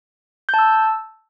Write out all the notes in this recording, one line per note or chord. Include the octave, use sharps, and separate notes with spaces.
A5 E6 G6